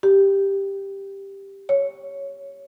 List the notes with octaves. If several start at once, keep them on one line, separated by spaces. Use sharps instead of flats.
G4
C#5